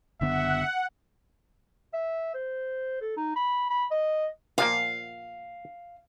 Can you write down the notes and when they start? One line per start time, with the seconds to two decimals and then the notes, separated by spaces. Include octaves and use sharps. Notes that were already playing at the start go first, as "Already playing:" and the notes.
0.21 F#1 D3 B3 E5 F#5
1.94 E5
2.34 C5
3.01 A4
3.17 D#4
3.36 B5
3.70 B5
3.91 D#5
4.58 A#2 F3 A#3 F5